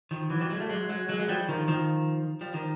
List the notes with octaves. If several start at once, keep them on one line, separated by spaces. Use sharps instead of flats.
D#3 F3
E3 F#3
F3 G3
F#3 G#3
G3 A3
F#3 G#3
F#3 G#3
F#3 G#3
G#3
F3 G3
D#3 F3
D#3 F3
F3 G3
D#3 F3